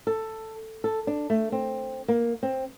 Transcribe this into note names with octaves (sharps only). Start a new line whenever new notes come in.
A4
A4
D4
A3
C4
A#3
C4